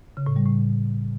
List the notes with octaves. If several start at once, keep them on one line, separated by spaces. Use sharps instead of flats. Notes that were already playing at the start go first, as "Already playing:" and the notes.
C#3
A2
G3
A2